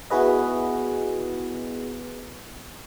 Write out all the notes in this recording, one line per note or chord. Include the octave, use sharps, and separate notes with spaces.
B3 E4 F#4 G#4 B4 D#5